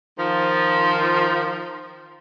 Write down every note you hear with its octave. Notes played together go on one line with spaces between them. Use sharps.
D#3 F3